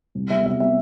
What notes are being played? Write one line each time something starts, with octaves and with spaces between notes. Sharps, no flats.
C2
C3 G3 B3 E5
C2 E5
C3 G3 B3 E5